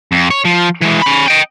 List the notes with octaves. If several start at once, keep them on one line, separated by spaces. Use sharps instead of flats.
F2
C#5
F3
E3 G#3
C#4 B5
D#5 G5